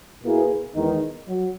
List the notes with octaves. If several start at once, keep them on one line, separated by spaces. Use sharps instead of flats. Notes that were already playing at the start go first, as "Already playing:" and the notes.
B2 A#3 E4 G#4 B4
E2 D#3 G#3 D#4
F#3